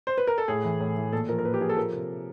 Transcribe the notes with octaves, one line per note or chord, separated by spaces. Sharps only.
C5
B4
A#4
A4
A2 G#4
E3
A2
E3
A#2 A4
F3 A#4
A#4
A#2 B4
G4
F3 G#4
A4
F3 A#4
C3